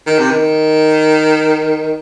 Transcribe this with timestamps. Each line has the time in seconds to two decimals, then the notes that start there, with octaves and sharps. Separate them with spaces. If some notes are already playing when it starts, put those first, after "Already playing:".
0.07 D#3
0.19 C3
0.31 D#3